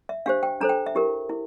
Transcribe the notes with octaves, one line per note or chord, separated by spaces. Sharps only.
E5
D4 G4 C5 F5
G5
D4 A4 C5 A#5
G5
E5
E4 G4 A#4
E4